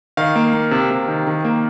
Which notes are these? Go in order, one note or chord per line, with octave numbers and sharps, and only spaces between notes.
D#3 F5
A#3
A#3
C3
C3
D#3
D#3
A#3